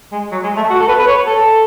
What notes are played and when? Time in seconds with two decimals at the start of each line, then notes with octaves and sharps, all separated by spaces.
0.12 G#3
0.31 F#3
0.43 G#3
0.56 A3
0.70 F#4
0.80 A4
0.88 B4
0.98 B4
1.07 C#5
1.27 A4